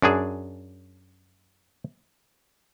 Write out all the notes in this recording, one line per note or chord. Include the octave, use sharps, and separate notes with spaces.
F#2 D4 G#4